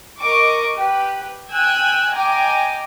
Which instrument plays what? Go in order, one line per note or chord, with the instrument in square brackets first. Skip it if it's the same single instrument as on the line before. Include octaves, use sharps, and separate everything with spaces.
[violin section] A#4 D#5 C#6 D6
G4 B4
G5 G#5 E6 F#6 G#6
D#5 G5 G#5 A#5 D6